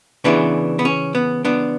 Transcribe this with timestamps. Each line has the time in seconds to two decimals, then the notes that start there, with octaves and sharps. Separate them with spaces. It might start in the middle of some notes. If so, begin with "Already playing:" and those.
0.24 C#3 E3 B3 D4
0.79 B3
0.85 C#4
1.15 B3
1.45 B3 D4